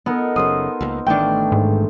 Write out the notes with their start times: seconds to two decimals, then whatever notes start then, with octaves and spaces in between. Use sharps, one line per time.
0.06 B3 D#4 A4 A#4
0.36 F#1 F#2 C#3 C5 D#6
0.81 C#2 G3 A#3
1.06 A1 D#3 A3 D4 G5
1.52 G#2